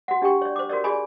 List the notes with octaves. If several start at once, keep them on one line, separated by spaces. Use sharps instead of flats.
F#4 F#5
D4 G4 F#5 G5 C#6
C#5 D5
C5 D6
F#4 A#4 C#5 D5
G#4 D5 G#5 B5